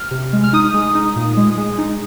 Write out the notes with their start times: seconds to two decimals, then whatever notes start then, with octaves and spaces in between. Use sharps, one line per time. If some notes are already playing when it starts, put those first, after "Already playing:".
Already playing: F6
0.11 C3
0.33 G#3
0.44 F6
0.53 D#4 D#6
0.74 G#3
0.95 D#4
1.16 A#2
1.37 G#3
1.57 G#3
1.78 D#4